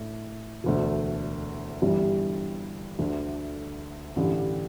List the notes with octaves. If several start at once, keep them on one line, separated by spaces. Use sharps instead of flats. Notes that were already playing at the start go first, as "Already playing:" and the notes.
Already playing: A2 A3 D4
E1 D2 D3 A3
G1 G2 E3 G3
D2 D3 A3
A1 G2 D3 G3